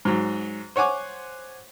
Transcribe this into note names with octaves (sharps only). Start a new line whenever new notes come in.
G#2 F#3
C5 C#5 F#5 G#5 D6